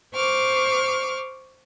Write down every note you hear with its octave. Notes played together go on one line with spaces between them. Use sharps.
C5 C#6 D6 F6